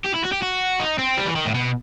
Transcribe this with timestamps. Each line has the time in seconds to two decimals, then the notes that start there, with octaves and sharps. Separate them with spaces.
0.04 G4
0.14 E4
0.24 F#4
0.32 G4
0.42 F#4
0.79 D#4
0.98 C4
1.17 G3
1.26 E3
1.36 D#3
1.46 A2
1.54 B2